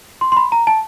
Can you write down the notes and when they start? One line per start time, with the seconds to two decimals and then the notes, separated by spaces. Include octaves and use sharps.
0.21 C6
0.32 C6
0.37 B5
0.52 A#5
0.67 A5